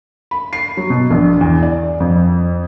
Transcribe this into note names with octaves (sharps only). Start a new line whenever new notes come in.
B5
C7
F#3
B2
A#1
E2
D5
F2